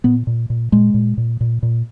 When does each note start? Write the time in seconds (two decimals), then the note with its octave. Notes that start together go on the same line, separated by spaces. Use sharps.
0.04 A#2 B3
0.27 A#2
0.50 A#2
0.72 A#2 G#3
0.94 A#2
1.18 A#2
1.41 A#2
1.63 A#2